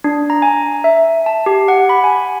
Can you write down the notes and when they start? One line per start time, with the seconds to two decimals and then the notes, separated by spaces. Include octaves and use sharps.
0.04 D4
0.30 A#5
0.42 G#5
0.84 E5
1.26 A5
1.46 G4
1.68 F#5
1.89 B5
2.04 G#5